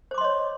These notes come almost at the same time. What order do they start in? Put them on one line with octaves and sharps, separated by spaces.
C5 D6 C6 D#5 C#5